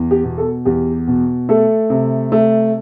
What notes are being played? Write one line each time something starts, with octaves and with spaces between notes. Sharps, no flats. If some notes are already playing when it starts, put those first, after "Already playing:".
Already playing: E2
G4
B2
A4
E2 G4
B2
A3 A4
C3
A3